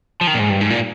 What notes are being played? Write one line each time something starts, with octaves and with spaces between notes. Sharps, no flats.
F3
D#3
A#2
G#2
G2
G#2
A#2